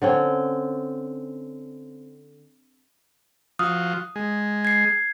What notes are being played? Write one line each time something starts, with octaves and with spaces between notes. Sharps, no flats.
D3 C4 C#4
F3 F4 F#4 D#6
G#3
G#6 C7